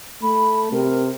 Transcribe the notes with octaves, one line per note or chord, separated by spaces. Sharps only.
A3 B5
C3 A#4